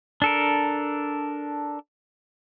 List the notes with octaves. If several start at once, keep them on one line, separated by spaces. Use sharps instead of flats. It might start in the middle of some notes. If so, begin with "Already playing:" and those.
D4 A4 A#4